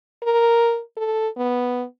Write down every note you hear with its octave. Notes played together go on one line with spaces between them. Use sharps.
A#4
A4
B3